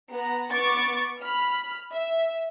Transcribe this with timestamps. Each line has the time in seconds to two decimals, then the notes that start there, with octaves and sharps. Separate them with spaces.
0.12 B3 A#5
0.51 B3 C#6 D6 A6
1.20 B5 F6
1.92 E5